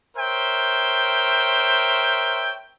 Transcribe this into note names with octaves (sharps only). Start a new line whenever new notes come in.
A#4 C5 C#5 E5 G5